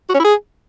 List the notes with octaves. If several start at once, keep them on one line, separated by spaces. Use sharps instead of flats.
F#4
C#4
E4
G#4